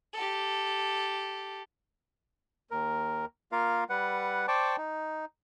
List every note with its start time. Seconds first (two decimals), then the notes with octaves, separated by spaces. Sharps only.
0.13 G4 A4
2.71 D#2 A#4
3.52 A#3 F4 A#4 F5
3.89 G3 B4 F#5
4.48 C5 D5 G5 A5 C#6 D6
4.78 D#4